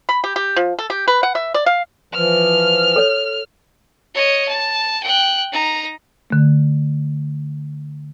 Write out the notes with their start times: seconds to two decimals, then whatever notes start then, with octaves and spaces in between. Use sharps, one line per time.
0.09 B5
0.24 G4
0.36 G4
0.56 F3
0.79 A4
0.90 G4
1.08 B4
1.23 F#5
1.35 E5
1.54 D5
1.66 F5
2.14 E3 F3 F6
2.96 A4 C#5
4.14 C#5 D#5
4.48 A5
5.03 G5 F#6
5.52 D#4 A#5
6.30 D3 A3